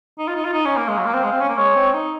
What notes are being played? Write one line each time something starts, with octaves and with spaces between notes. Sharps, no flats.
D#4
F4
D#4
F4
D#4
C#4
A#3
G#3 F5
F#3
A#3
C4
G#3
C4
C#4
A#3
G#3 C#5
C4
D#4